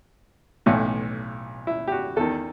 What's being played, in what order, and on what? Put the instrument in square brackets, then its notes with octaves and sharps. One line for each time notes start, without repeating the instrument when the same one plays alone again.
[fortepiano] B1 A2 E3
E4
G4
F#4
E2 D#3 A4